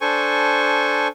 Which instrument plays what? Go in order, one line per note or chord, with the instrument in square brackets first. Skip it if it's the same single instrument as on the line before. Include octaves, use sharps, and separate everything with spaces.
[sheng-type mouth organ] D4 A4 C5 G#5 C#6